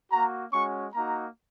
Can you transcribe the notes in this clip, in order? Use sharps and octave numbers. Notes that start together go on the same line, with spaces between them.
A#3 F#4 A#5
G#3 C#4 F#4 C#6
A#3 D#4 F#4 A#5